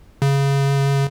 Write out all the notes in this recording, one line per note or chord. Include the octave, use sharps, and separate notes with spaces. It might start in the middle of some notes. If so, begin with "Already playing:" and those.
C#3